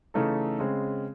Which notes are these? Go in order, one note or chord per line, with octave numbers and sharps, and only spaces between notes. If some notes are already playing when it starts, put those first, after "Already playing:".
C#3 E3 A3 D#4 A4
C#3 G#3 C4